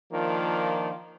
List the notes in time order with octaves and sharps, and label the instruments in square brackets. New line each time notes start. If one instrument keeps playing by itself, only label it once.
[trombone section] D#3 F3 A#3 D4 F4